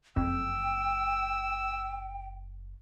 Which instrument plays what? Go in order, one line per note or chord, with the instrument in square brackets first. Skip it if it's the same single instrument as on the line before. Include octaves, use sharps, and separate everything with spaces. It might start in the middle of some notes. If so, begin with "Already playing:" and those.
[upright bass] F#1 [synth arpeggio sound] F2 [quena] G5 [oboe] E6